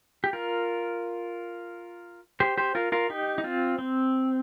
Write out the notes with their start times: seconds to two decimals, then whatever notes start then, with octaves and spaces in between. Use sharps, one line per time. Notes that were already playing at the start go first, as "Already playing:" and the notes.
0.24 G4
0.33 F4 A#4
2.40 G4 C5
2.58 G4 C5
2.75 F4 A#4
2.92 F4 A#4
3.10 D#4 G4
3.38 D#4
3.44 C4 F4
3.79 C4